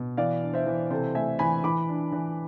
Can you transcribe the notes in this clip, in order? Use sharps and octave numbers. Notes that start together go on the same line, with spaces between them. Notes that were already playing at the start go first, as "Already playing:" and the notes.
Already playing: B2
E3 D5 F5
D4
C5 E5
E3
C3 A4 C5
A3 E5 G#5
E3 G#5 B5
E3 B5 D6
D4
E3